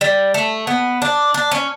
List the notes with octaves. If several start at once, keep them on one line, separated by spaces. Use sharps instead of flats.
G3
A3
B3
D4
D4
C#4